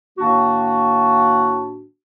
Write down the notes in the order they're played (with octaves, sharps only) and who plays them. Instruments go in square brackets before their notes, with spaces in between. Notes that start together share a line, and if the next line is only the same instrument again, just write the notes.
[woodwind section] A2 D#3 A#3 D4 F#4